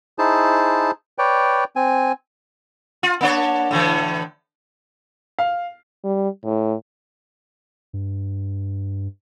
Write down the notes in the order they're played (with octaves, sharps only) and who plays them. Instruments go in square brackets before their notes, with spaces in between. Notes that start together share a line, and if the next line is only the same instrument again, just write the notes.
[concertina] D#4 E4 G#4 C5 A5
B4 C#5 D5 G5
C4 G#5
[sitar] F4
A#3 D4 C#5
A2 D3 E3
[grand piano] F5
[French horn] G3
A2
[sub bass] G2